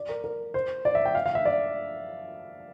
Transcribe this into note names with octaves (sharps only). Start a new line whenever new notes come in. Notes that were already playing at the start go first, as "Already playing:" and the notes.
Already playing: D5
A#4
A#4
C5
D5
E5
G5
F5
F5
E5
D5